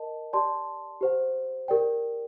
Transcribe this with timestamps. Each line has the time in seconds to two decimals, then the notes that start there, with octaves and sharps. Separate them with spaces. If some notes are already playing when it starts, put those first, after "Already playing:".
Already playing: A#4 D#5 A5
0.33 G4 D5 A5 C6
1.01 G4 C5 F#5
1.68 G4 A#4 D5 G5